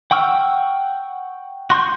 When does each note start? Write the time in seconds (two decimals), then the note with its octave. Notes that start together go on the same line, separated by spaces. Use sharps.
0.11 F#5 G5 C#6 E6 F6
1.70 F#4 C6 C#6 G6